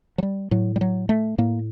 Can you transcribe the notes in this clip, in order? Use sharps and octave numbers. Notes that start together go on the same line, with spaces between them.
F#3
G3
A2 F#3
G3
F#3
A3
A2 A#3